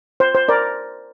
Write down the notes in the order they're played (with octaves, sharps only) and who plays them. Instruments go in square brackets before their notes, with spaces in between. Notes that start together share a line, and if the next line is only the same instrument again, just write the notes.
[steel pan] C5
C5
A#4 D5